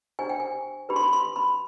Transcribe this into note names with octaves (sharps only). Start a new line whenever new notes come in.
D4 G4 C5 G#5
G5
G#5
D4 G4 B4 B5
C6
B5
C6
B5